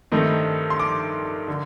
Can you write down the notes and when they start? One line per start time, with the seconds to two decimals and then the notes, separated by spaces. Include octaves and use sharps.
0.12 G2 D#3 A3 C4 D#4
0.70 C6
0.79 D6
1.48 D3